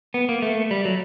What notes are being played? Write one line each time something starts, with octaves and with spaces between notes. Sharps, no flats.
B3
A#3
A3
G3
F#3